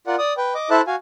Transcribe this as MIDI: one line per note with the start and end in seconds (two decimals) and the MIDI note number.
0.07 0.16 65
0.07 0.16 70
0.07 0.16 74
0.07 0.16 78
0.18 0.33 74
0.18 0.33 87
0.37 0.54 71
0.37 0.54 79
0.55 0.70 75
0.55 0.70 86
0.70 0.81 64
0.70 0.81 69
0.70 0.81 72
0.70 0.81 76
0.70 0.81 81
0.70 0.81 90
0.87 0.96 66
0.87 0.96 77
0.87 0.96 80